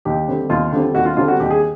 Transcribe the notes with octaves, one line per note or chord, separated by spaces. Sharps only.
D#2 G4
D3 G3 C4
D#2 F4
D3 G3 C4
D#2 F#4
F4
D3 G3 C4 F4
F#4
D#2 G4
G#4